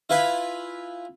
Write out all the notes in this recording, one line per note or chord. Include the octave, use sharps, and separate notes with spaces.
E4 F4 B4 G#5 B5